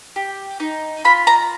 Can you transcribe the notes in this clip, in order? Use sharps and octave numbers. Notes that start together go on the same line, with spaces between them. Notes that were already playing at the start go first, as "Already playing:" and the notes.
G4
D#4
F4 B5
A#5